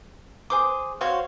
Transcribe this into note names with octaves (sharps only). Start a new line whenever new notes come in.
G#4 C5 D6
F#4 C5 C#5 F5